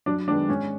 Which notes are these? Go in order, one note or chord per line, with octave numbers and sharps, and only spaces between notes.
F#2 D4
D#3 G#3 B3 D4
G#2 C#4